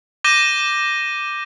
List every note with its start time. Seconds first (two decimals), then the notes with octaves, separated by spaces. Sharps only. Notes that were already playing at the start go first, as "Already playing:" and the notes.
0.24 D6 G6 A#6 D#7 G7